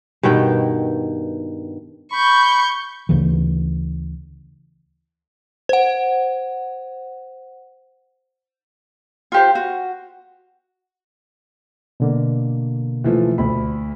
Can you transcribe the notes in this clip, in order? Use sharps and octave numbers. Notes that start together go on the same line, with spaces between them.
G2 B2 D#3 G5
B5 C#6 G6
D2 C#3 E3
C5 F#5
F4 G4 C5
F#4
B2 D3 A#3
E3 F3 A3
D2 B5